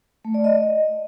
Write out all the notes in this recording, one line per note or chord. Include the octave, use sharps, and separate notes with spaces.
A3
D5
D#5